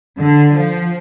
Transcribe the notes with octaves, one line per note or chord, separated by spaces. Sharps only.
D3
F3